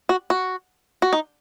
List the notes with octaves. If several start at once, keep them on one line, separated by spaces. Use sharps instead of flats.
F#4
F#4
F#4
D#4